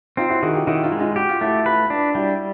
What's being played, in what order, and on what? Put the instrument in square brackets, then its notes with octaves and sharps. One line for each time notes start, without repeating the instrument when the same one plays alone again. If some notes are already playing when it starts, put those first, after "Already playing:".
[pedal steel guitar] C4 [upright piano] D#4 F4
[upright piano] E4 F#4
[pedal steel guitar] D#3 [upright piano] F#4 G#4
[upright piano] F4 G4
[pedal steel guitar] D#3 [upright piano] E4 F#4
[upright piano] D#4 F4
[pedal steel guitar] G#3
[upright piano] D#4 F4
[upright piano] F#4 [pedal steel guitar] G4
[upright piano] F4
[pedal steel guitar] A3 [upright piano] E4 F#4
[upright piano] F4 G4 [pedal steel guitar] B4
[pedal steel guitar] D4
[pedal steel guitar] G3 [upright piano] E4 F#4